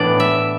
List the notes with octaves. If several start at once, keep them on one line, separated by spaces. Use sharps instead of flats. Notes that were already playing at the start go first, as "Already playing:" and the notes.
Already playing: A2 E3 B3 D4 D5
E5